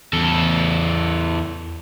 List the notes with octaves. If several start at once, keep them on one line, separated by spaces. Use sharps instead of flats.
E2 A4